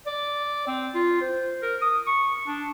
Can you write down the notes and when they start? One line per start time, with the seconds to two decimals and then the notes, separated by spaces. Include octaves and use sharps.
0.07 D5
0.67 C4
0.95 F4
1.21 C5
1.62 A#4
1.82 D#6
2.07 C#6
2.47 D4